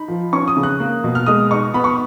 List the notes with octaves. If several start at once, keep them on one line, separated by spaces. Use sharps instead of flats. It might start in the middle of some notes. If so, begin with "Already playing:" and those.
Already playing: D#4 B5
F3
C#4 C#6
D#6
C#3
F#6
A#3
B2
F6
G#3 D#6
D#4 C#6
B3 B5
C#6